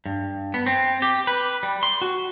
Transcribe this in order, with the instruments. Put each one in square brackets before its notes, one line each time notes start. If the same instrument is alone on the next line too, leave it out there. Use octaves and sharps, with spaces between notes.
[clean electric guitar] G2
B3
C4
G4
B4
G3
C6
F#4